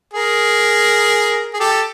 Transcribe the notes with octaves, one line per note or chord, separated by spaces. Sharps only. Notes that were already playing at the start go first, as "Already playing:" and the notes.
G#4 A#4
G#4
G4 A4